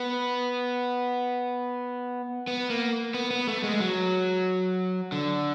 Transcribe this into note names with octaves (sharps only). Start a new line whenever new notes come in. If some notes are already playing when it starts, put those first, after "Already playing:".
Already playing: B3
B3
A#3
B3
B3
A3
G#3
F#3
D3